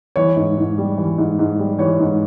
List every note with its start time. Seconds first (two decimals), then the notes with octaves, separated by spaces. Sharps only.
0.16 E3 C#5
0.36 G#2
0.57 G#2
0.78 G3
0.98 E3
1.18 G#2
1.39 G#2
1.59 G3
1.79 E3 C#5
1.99 G#2